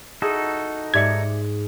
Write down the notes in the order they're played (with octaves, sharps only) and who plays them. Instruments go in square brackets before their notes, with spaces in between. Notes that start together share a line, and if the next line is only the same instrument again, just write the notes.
[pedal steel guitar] D#4 F#4 A4 [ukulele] E4 G#4
[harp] G#2 G#3 C#7 [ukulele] G4 D5 E5 [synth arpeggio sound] G#6